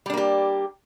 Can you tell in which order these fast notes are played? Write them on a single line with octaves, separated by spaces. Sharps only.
G3 D4 A#3 G4